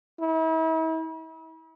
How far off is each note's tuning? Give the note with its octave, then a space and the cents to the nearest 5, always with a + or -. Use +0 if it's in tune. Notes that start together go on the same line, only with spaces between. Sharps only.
E4 -40